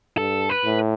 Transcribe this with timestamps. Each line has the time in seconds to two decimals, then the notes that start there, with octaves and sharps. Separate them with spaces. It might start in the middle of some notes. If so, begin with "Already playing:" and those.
0.18 G2 A4
0.49 B4
0.64 A2